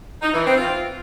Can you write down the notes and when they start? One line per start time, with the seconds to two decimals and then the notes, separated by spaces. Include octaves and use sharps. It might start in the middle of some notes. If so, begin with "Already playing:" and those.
0.22 D#4
0.34 E3
0.46 C4
0.58 F4